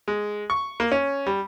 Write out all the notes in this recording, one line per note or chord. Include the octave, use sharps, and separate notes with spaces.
G#3
C#6
A#3
C#4
G3